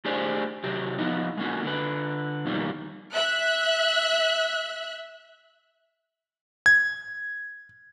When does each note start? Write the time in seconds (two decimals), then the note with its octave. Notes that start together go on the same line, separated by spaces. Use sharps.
0.05 A3 D4 G4 G#4 C5 D5
0.64 C3 F#3 G4
0.99 F3 B3 D#4
1.37 G#3 A#3 C#4 F#4
1.63 D3 B4
2.45 F2 B2 D#3 G3 A#3
3.13 E5 F#6
6.66 G#6